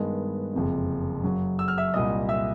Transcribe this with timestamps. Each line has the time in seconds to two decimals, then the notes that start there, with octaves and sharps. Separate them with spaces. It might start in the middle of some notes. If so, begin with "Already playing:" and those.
Already playing: G2 D#3 G#3 B3
0.53 F#1 F2 C3
1.23 F#2 C#3 F#3
1.59 E6
1.68 F6
1.78 E5 E6
1.94 C2 A#2 G3 D#5 D#6
2.29 E5 E6